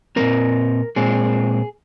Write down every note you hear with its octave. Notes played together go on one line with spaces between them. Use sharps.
A#2 G#3 C4 A#4
A#2 G#3 C4 G#4